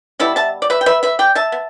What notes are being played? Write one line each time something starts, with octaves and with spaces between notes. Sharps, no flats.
B2 G3 B3 E4 A4
E5 A5
D5
B4 E5
G5
B4 E5
B4 E5
D5 G5
E5 A5
B3